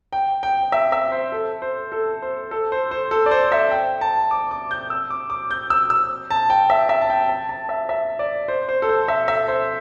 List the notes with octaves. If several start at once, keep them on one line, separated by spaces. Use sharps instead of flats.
G5
G5
E5
E5
C5
A4
C5
A4
C5
A4
C5
C5
A4
D5
C5
E5
G5
A5
D6
D6
G6
E6
D6
D6
G6
E6
E6
A5
G5
E5
E5
A5
G5
A5
A5
E5
E5
D5
C5
C5
A4
C5
E5
E5
C5